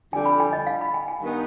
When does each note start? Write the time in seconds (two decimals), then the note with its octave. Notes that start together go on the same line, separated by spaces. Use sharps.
0.13 F2 D3 G3 D4 G#5
0.26 B5
0.40 G#5
0.53 D#5
0.67 F5
0.81 B5
0.94 G#5
1.08 G#5
1.22 G2 D#3 B3 D#4